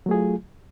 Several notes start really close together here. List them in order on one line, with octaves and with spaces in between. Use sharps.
F#3 A3 G#4 F4